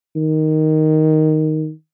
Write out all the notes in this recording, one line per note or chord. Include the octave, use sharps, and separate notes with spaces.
D#3